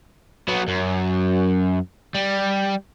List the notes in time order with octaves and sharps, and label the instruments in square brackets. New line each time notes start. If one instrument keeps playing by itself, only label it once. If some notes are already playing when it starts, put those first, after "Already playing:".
[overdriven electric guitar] F#3 B3
F#2
G3